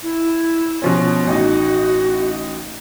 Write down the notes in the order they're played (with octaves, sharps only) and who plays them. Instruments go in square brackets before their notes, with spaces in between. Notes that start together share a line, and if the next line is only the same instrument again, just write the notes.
[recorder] E4
[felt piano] B2 F3 C#4
[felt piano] A1 D#4 [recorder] F#4